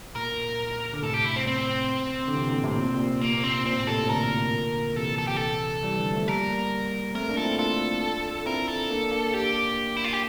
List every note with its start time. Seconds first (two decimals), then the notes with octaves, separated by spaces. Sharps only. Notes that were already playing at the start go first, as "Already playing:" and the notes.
0.15 A#2 A#4
0.93 D3
1.03 A2 C3 A4
1.14 G4
1.25 E4
1.36 C4
1.47 C4
2.28 D3
2.34 C3 E3
2.49 A#2 D3
2.64 A2 C3
2.78 A#2
2.87 C3
2.96 A#2
3.21 A#3
3.44 C4
3.65 A#2 C4
3.76 A2
3.83 C3
3.87 A#2 A4
3.98 A2 C3
4.09 A#2 D3 A#4
4.96 C3 E3 A4
5.19 A4
5.27 G4
5.36 A4
5.83 E3 G3
5.98 D3 F3
6.13 F3 A3
6.27 G3 A#3 A#4
7.15 A3 C4 A#4
7.29 A#3 D4
7.37 F4 A4
7.45 C4 E4
7.58 D4 F4 A4
8.46 C4 E4 A#4
8.68 A4
8.90 A#3 D4
9.11 A#3 D4
9.34 G4
9.96 E4
10.04 F4
10.13 G4